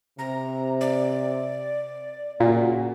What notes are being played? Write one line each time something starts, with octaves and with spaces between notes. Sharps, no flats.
C3 A#5
D5
A#2 C#3 A#3 F#4